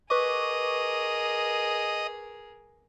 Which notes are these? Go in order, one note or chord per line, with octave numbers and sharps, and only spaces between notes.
G#4 A#4 B4 D#5 C#6 D6